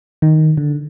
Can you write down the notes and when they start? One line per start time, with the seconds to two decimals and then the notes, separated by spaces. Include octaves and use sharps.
0.22 D#3
0.57 D3